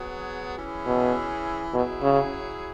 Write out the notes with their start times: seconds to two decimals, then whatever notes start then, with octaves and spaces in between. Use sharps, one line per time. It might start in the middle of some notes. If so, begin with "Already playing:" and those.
Already playing: F#3 B3 G#4
0.57 E3 C#4 E4 G#4
0.86 B2
1.73 B2 F#3 E4 G#4
2.02 C#3